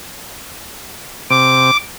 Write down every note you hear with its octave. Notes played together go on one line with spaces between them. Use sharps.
C3 D6